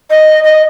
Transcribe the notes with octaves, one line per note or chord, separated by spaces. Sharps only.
D#5
D#5